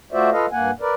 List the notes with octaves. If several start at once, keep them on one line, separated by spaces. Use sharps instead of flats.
A3 F4 F#4 C5 D5 E5
F4 A4 B4 D#5 F5
G2 A#3 F#5 G#5
A#4 B4 D5